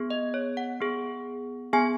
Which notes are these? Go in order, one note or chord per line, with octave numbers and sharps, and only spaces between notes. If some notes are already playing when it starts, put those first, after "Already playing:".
Already playing: B3 G#4
D#5
C#5
F#5
B3 G#4
B3 G#4 G#5